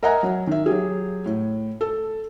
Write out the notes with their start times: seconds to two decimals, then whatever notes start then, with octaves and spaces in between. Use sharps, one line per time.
0.03 A#4 D#5 E5 F#5 G#5 A#5
0.23 F#3
0.47 D#3 E5
0.66 F#3 G4 G#4
1.26 A2
1.81 A4